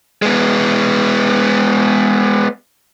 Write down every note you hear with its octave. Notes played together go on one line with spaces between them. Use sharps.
G#3 B3